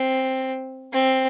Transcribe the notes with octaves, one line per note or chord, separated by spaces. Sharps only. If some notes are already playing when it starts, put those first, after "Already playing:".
Already playing: C4
C4